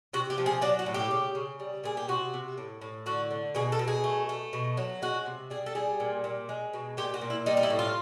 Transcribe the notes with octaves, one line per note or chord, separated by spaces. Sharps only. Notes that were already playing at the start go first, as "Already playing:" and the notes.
C3 F#4
G4
F3
G#4
F#3 D4
F#4
A2
G4
C#3
C#3
G3
A#2 G#4
G4
C3 F#4
C3
A2
A2
D3 F#4
D3
B2 G#4
A4
B2
G#4
A3
A3
B2
F#3
G#3 F#4
C3
G3 G#4
A4
G3 G#4
A#2
A#2
G#3
B2
A#2 G4
F#4
A#2
E4
G3 D#4
D#4
E4
A2
F4